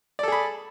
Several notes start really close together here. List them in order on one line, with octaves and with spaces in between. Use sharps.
D5 A4 G#4 B5